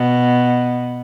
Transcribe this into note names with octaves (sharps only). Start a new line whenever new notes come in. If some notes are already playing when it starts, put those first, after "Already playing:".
Already playing: B2